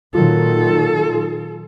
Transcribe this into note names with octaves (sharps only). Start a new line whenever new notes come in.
A#2 D#3 F#3 F4 A4